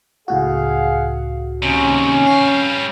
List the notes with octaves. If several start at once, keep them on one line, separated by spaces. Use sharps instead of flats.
C#2 A2 F#4 G#4 F5 F#5
D#2 C3 C#4
G3 F5